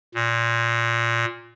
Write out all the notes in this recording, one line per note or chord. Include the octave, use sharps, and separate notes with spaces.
A#2